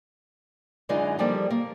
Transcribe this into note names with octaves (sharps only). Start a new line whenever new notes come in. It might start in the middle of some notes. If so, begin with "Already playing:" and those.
F#2 D3 E3 G#3 D#4 F4
F3 G3 A#3 G4 A4 D5
A#3